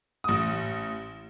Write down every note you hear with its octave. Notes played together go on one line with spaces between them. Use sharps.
A1 D#6